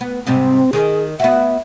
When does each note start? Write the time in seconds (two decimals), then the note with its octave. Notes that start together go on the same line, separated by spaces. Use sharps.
0.01 B3
0.27 G#2 C3 G3 C4
0.73 D#3 G#4
1.20 B3 F#4 E5